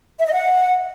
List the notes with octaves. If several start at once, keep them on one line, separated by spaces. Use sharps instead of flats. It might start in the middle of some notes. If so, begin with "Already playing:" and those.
E5
D#5
F#5